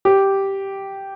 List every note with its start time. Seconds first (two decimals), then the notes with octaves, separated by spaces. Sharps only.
0.05 G4